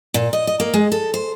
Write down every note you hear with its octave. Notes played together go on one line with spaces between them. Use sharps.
A#2
D#5
D#5
A#3
G#3
A4
C5